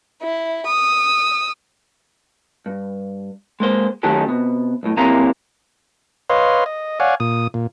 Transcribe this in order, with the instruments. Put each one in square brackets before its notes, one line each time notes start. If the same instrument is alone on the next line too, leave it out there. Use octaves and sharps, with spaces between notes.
[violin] E4
D#6 E6
[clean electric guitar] G2
G#3 A#3 C5
D#3 F#3 A3 C#4 G4 A4
C3 B3
B1 A2
B1 C3 A#3 C#4 E4 A#5
[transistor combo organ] B4 C#5 D#5 F5 C6
D#5
C#5 D5 F5 F#5 G#5
A#2 D#6
A#2